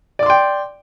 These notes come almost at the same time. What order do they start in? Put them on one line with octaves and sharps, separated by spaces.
D5 D6 C6 G5